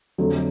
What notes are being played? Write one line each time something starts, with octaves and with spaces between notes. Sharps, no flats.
F2 D3 F#3 A3